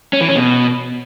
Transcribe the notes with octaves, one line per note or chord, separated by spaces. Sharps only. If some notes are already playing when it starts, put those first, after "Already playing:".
C#4
E3
C#4
B2